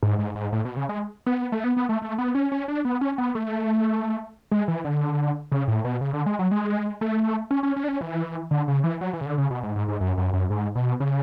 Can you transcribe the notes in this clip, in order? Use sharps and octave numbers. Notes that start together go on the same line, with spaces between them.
G#2
G#2
G#2
A2
B2
C#3
G#3
B3
A3
B3
B3
A3
A3
B3
C#4
C#4
D4
B3
C#4
B3
A3
G#3
E3
D3
C#3
A2
B2
C#3
D3
G#3
F#3
G#3
A3
C#4
C#4
C#4
D4
C#4
E3
D3
C#3
E3
F#3
E3
C#3
D3
C#3
B2
G#2
G#2
G#2
F#2
F#2
F#2
G#2
B2
C#3